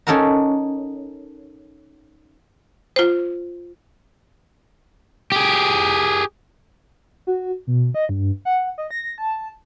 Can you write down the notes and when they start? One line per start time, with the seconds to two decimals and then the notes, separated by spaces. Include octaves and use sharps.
0.07 C#4 D#4 A4 A#4 F#5 A#5
2.96 F4 C5
5.32 G4 G#4
7.27 F#4
7.67 B2
7.94 D#5
8.09 G2
8.45 F#5
8.78 D#5
8.91 A#6
9.18 A5